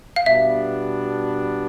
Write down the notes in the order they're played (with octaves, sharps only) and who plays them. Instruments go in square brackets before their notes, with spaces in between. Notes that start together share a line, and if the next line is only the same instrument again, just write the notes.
[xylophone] F5
[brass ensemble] B2 G3 B3 D4 [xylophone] E5